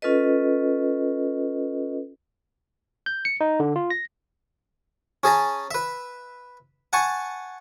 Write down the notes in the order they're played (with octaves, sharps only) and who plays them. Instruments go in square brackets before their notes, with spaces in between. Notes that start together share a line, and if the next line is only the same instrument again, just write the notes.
[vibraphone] C#4 F4 A4 B4 D#5
[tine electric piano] G6
C#7
D#4
D3
F4
A#6
[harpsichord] C#4 G#4 A5 A#5
B4 E5
F#5 G#5 A5 C#6